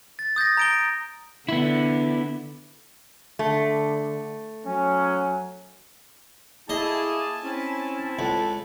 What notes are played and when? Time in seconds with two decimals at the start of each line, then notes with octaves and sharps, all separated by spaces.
0.19 A6
0.36 D#6 G6 A6 A#6
0.57 A#5 D7 G7
1.49 D3 B3 E4
3.39 D3 A3
4.66 F#3 C#4
6.69 A3 A#3 E4 G#4 D#5 G#5 A5
7.43 C4 C#4 E4
8.19 C#2 A4